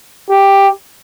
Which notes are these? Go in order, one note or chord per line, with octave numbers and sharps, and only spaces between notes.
G4